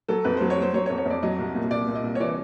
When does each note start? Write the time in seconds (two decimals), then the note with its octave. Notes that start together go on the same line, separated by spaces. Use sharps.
0.08 F#3 A4
0.24 F2 B4
0.37 F#3 C5
0.50 C#5
0.58 F#3 C5
0.73 F#3 C#5
0.86 C#5
0.90 F2
0.98 C#5
1.05 F2 D5
1.23 F#3 D#5
1.38 C2
1.55 A#2
1.71 C2 D5
1.87 A#2
1.95 D#5
2.03 C2
2.15 C#5
2.20 E3 D5